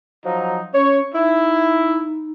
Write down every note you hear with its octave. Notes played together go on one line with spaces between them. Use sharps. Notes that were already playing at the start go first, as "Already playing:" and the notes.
F3 F#3 D#4
C#4 C#5
D#4 E4